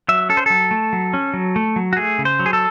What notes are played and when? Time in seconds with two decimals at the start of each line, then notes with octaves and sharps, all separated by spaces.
0.09 F#3 E5
0.29 C#4 A4
0.37 C5
0.46 F#3 A4
0.71 A3
0.93 F#3
1.14 C#4
1.34 F#3
1.56 A3
1.76 F#3
1.93 F#4
1.97 A3 G#4
2.19 C#3
2.25 C5
2.39 F#3
2.46 G#4
2.53 A4